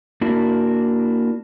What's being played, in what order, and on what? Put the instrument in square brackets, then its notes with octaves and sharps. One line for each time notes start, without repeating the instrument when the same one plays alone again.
[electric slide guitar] A#3 D4 E4 F#4 A#4